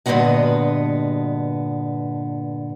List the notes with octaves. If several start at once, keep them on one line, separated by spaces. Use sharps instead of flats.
G2 A#2 D3 B3 F#4 D#5